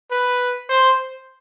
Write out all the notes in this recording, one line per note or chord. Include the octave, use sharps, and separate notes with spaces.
B4
C5